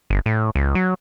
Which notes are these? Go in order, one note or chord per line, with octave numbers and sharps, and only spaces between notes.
G1
A2
C#2
F#3